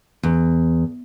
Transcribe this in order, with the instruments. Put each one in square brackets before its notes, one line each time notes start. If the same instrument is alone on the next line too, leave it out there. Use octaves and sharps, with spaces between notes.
[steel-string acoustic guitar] E2